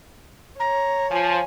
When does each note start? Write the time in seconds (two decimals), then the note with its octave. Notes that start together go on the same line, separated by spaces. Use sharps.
0.60 C#5 A#5
1.11 F3 G#5